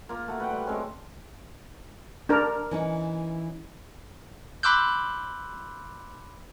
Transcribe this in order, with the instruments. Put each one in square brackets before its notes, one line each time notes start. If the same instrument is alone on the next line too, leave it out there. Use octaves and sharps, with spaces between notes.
[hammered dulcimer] A#3 F4 A#5
A3 F#4
B4 F#5 G5
G3
G#3 C4 C#4 A4
[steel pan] D4 A#4
[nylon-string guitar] E3 C#4 D#4
[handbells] B5 C6 D6 E6 F#6 G6